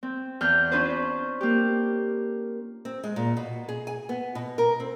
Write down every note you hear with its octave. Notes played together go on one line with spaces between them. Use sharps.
C4
E2 F6 G6
C#4 D4 F4 B4 C5
A#3 G4
C4
G#3
A#2
B2
G#4
G#5
B3
B2
A#4
C4